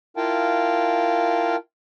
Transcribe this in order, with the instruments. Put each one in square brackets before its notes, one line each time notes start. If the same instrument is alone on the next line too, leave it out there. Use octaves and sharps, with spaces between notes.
[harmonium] E4 F4 A#4 F5 G5 A5